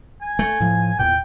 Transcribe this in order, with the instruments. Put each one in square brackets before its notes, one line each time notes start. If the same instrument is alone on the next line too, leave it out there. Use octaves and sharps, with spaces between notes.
[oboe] G#5
[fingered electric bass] A3
A2 F3
[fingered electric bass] E2 A#2 [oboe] G5